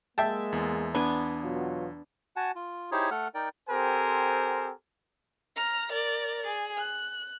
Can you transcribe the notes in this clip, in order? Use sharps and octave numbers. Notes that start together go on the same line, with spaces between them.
G#3 A#3 E5 G5 A5
E2
B3 D4 G#5
B2 F#3 F4
F#4 F#5 G#5 A5
F4
D#4 E4 G4 G#4 C5 C#5
A3 A4 F#5 F6
D#4 A#4 D5 G5
C4 G4 A4 A#4 C5 G#5
A#5 F6
A#4 D5
G#4
F#6